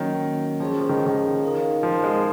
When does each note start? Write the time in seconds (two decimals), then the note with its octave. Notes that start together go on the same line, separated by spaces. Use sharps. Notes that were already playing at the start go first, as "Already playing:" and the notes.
Already playing: D#3 F#3 A#3 C#4 F#4 C#5
0.60 F3 C#4 G#4 C#5
0.81 F3
0.89 D#3
1.06 D#3
1.43 D#4 A#4 F5
1.83 F3
2.04 G#3